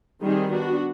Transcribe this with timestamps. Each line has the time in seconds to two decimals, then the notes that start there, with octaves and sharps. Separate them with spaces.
0.23 D#3 G3 C4 D#4 G#4
0.50 B3 D4 F#4